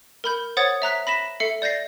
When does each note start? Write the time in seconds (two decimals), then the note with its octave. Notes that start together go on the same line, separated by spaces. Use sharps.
0.24 A#4 B5 G6
0.57 C5 C#5 F#5 D#6 G#6 A6
0.82 E5 A#5 F#6 B6
1.07 B5 A#6 B6 E7
1.40 A4 E5 C7 C#7
1.62 D5 G6 A6 A#6 C7